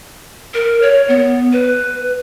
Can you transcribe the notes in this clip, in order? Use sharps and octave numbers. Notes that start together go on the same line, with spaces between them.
A#4
C#5
B3
B4